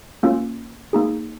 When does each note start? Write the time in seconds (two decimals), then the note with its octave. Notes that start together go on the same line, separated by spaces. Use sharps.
0.23 A#3 C#4 F4
0.93 A#3 D#4 G#4